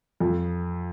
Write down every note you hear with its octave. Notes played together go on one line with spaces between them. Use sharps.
F2